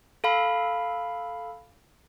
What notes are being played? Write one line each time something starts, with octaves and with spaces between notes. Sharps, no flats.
A4 F5 B5